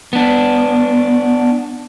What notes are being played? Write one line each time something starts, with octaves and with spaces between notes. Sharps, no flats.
B3 D4